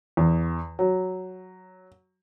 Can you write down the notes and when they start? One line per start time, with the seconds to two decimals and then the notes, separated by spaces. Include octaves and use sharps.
0.17 E2
0.79 F#3